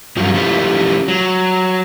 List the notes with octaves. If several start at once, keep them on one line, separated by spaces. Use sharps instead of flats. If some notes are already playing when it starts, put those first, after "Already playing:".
G2 F3 F#3
F3 A3 C#4 E4 F4 G4
F#3